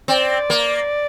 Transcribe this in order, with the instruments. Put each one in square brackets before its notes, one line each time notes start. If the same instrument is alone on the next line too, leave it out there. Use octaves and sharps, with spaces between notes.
[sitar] C4 [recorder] D5
[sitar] A#3